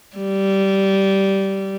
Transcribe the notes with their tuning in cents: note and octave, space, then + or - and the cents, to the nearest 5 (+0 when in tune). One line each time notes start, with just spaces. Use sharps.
G3 -15